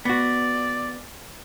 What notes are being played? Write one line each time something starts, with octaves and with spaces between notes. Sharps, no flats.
B3 F#4 D5